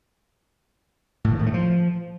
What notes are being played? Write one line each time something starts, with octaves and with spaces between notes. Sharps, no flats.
A2
D#3
A2
A3
F3